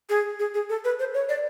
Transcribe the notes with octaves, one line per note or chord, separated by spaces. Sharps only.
G#4
G#4
G#4
A4
B4
C5
C#5
D5